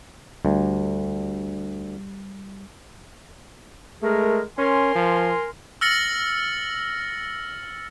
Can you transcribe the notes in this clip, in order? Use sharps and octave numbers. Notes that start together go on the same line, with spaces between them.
D2 G3
G#3 A3 G#4 A#4
C#4 A#4 G#5 C6
F3
E6 F6 A6 A#6 C#7 F#7